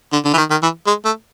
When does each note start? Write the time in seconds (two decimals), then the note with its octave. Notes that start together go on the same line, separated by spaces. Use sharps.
0.13 D3
0.25 D3
0.33 E3
0.37 D#3
0.50 D#3
0.63 E3
0.87 G#3
1.05 A3